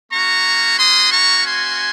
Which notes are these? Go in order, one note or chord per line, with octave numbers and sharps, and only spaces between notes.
A#3 C#4 F#4 A#5 C#6
C6 D#6
A#5 C#6
G#5 C6